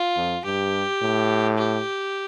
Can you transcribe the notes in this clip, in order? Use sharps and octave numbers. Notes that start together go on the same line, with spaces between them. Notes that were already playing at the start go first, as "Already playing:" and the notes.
Already playing: F4
F2
G2 G4
A2
G4